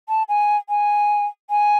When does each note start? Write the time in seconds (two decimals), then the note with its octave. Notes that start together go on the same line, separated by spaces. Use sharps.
0.09 A5
0.29 G#5
0.69 G#5
1.50 G#5